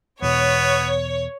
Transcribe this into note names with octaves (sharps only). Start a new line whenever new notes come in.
E2 B2 B3 C#5